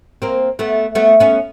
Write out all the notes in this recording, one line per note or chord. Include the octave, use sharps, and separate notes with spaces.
A#3 C4
A3 B3
A3 B3
B3 C#4